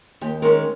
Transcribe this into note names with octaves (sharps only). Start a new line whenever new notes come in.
D#2 G4
D#3 G#3 C#4 A#4